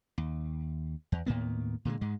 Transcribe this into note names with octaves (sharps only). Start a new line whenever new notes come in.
D#2
E2
D#2 A2 A#3 B3
A#2 D3 F3 G#3
G#2 G#3